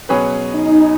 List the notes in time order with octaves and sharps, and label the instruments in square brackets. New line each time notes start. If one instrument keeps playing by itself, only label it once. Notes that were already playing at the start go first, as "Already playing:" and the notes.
[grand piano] B2 F#3 C#4 G#4 B4
[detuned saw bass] D#4